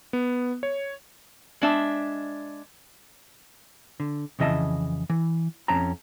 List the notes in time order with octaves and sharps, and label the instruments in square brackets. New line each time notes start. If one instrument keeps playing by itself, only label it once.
[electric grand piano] B3
C#5
[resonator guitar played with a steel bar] G#3 D4 E5
[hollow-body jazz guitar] D3
F2 C#3 E3 D#5 E5 A5
E3
F2 C#4 A5 A#5